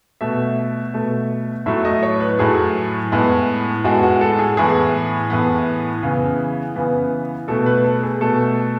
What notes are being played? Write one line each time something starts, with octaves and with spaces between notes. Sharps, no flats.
B2 A3 E5
B2 A3
A2 F#3 A3 E5
D#5
C#5
B4
A2 F#3 A3 G#4
A2 G#3 B3
A2 G#3 B3 F#4
F#4
A4
G#4
A2 E3 B3 G#4
A2 E3 B3
C#3 E3 B3
C#3 E3 B3
B2 A3 A4
B4
A4
G#4
B2 A3 A4